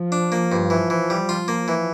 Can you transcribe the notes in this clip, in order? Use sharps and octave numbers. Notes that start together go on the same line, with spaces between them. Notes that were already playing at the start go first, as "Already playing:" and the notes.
Already playing: F3
D4
A#3
G2
E3
E3
G3
F4
A#3
E3